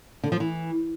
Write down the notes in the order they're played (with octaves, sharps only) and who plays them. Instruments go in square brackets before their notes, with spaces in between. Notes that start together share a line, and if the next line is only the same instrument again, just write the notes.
[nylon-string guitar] D3
F3
E3